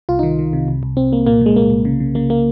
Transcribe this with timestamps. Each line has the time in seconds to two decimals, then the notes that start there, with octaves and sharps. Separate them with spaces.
0.09 C2 F4
0.19 D#3 D#4
0.39 D#3
0.53 C3
0.68 C2
0.83 C2
0.97 C2 C4
1.12 C2 A#3
1.26 A#2 A#3
1.41 A#2 G#3
1.56 C2 A#3
1.70 C2
1.85 C#3
2.00 C#3
2.15 C#3 A#3
2.30 A#3